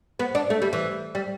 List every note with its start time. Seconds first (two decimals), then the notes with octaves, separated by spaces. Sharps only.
0.19 B3
0.35 D4
0.50 A3
0.62 G3
0.73 E3
1.15 G3